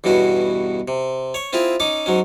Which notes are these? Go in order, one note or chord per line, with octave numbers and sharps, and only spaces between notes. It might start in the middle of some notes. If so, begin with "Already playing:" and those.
E2 G2 B2 C#4 F#4
C3
C#5 C#6
C4 E4 F4 G#4
C#4 D#4 D6
G#2 F#3 C#4